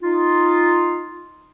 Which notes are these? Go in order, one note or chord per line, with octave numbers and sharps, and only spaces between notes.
D#4 F4